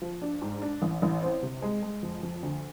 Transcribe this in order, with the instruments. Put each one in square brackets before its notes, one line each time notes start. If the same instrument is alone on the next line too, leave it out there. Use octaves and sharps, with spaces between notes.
[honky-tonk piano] F3
D4
G#2
D4
A1
A1
C4
C3
G#3
G#3
F2
F2
D2